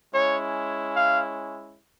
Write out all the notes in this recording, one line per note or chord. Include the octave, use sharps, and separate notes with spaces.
G#3 C#4 E4 C#5
F5